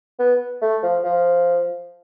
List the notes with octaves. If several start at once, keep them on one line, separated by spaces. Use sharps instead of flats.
B3
A3
F3
F3